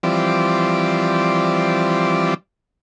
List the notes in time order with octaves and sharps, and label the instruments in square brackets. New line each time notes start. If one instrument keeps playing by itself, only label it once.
[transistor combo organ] E3 F3 G3 C4 D5